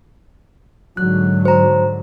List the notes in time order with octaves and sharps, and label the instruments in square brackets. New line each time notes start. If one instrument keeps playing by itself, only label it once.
[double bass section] G#2 D3 F#3 [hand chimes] F#6
[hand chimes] C5 A#5